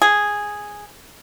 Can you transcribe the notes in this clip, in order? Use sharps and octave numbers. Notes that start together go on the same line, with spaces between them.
G#4